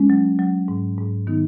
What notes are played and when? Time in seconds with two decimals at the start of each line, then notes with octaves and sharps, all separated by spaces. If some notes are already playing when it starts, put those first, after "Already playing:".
Already playing: G#3 C#4
0.10 F#3
0.39 F#3
0.68 G#2
0.98 G#2
1.27 D#3 B3 D#4